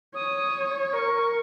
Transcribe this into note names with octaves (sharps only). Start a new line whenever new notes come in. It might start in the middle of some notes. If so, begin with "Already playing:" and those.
C#5 D#6
A#4 C#6